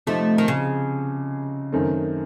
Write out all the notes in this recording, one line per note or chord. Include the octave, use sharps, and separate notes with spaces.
C3 F3 A3 C4 D#4
D#3
C#3
F#2 D#3 A3 C4